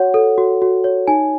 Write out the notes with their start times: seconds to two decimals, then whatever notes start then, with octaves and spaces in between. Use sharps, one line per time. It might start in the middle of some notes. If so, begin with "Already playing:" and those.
Already playing: F#4 C#5 F#5
0.14 A4
0.38 F#4
0.62 F#4
0.84 C#5
1.07 D#4 G#5